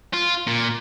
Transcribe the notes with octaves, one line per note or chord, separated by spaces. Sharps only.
F4
A#2